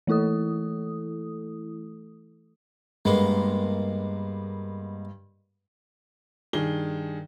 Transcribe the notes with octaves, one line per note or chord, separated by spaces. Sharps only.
E3 A3 E4 A4 D#6
G2 G#3 A#3 B3
G2 D#3 G#4 G7